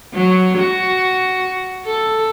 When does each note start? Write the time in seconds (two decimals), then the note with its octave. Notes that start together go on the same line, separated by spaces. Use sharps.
0.14 F#3
0.58 F#4
1.86 A4